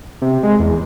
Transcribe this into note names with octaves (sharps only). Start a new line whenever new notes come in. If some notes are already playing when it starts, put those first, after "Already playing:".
C3
G#3
E2